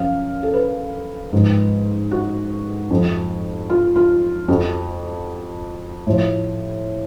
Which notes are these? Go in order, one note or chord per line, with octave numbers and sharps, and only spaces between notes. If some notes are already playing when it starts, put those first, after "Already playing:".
Already playing: F#2 F3 F5
A4
B4
G#2 F3
F#4
F2 F3
F4
F4
F2 F3 F#4
A2 F3